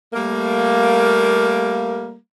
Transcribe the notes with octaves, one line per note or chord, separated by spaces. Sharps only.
G3 A3 A#3